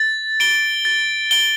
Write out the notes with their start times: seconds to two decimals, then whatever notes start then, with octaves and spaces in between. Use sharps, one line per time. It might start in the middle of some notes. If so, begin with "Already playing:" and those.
Already playing: A6
0.40 D7 G7
0.85 A6
1.31 D7 G7